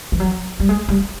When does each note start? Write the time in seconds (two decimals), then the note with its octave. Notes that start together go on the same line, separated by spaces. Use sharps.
0.12 F3
0.20 F#3
0.60 G3
0.69 G#3
0.89 G3